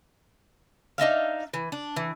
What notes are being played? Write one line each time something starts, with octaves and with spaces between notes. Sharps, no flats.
D4 D#4 E5 F5
E3
D4
E3